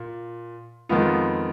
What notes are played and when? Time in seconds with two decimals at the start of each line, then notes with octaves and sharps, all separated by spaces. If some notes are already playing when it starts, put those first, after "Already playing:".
Already playing: A#2
0.89 F2 D#3 G#3 B3 F4